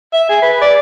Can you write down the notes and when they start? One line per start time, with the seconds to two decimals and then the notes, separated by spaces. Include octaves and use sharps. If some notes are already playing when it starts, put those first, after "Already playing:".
0.13 E5
0.29 G#4
0.42 B4
0.61 D5